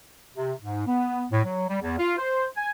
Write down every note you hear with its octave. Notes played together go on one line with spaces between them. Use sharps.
C3
G#2
B3
A2
F#3
G3
E2
F4
C5
G#5